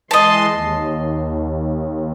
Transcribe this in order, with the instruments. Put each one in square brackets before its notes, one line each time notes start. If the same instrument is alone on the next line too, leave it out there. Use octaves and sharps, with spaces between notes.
[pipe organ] E3 G#3 C6 [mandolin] D#5 A5
[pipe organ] D#2